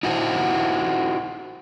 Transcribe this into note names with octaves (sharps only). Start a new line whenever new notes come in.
D#4 E4 F#4 A4 C5